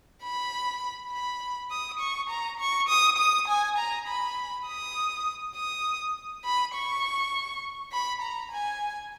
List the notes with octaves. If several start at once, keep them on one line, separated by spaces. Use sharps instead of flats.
B5
B5
D#6
C#6
A#5
C#6
D#6
D#6
G#5
A#5
B5
D#6
D#6
B5
C#6
B5
A#5
G#5